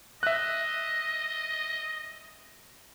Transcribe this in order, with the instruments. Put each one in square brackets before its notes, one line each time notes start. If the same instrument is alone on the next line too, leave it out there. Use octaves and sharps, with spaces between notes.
[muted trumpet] D#5 [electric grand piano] E5 F#6